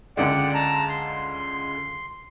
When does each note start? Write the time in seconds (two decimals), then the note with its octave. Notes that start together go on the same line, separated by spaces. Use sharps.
0.17 C#2 D3 G#3 D5 F#5 G5
0.54 A5 A#5
0.89 C6